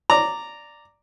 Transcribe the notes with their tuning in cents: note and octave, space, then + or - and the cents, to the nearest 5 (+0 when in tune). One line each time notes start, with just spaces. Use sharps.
D5 +0 A#5 -10